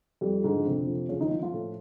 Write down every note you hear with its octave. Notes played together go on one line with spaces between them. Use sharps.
F2 G3
G#2 D3 G#3
F2 C3 C4
F3
C#3 F3 C#4
D#3 D#4
F3
F3 F4
A2